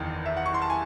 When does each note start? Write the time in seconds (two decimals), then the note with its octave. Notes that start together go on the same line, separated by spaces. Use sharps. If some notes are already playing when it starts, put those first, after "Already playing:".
Already playing: F#1 E2 D#3
0.26 E5
0.36 F#5
0.46 C#6
0.54 C6
0.62 A5
0.70 G#5